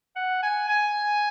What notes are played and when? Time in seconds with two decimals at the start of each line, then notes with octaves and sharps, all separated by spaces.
0.16 F#5
0.43 G#5
0.69 G#5